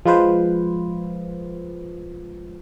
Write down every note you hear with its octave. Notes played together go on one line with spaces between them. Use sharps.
F3 G#3 F4 B4 C5